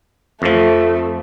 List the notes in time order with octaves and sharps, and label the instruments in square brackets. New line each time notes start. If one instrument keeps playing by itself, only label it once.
[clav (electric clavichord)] F2 F3 [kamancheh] A3